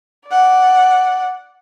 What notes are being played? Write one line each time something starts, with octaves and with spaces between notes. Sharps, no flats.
D5 F#5